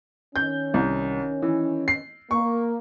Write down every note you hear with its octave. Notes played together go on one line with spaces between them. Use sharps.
D#3 C#4 G6
C2
E3
C7
A#3 C#6